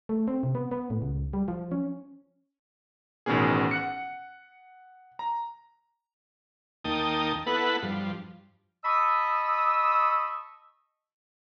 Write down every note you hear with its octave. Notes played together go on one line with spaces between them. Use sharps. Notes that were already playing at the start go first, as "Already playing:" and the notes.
A3
C4
C3
B3
B3
A2
C#2
G3
F3
C#4
A1 B2 D#3 B3 C#4 G#4
F#5 F#6 C#7
A#5
D#2 A#3 D#4 G5 A5 D#6
B3 E4 A4 B4 F#5
G2 F3
D#5 A5 B5 C#6 D#6 E6